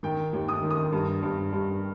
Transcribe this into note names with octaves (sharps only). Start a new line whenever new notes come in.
D#3 G5
D#2
D#6
D#3
D#6
G2
G2
G2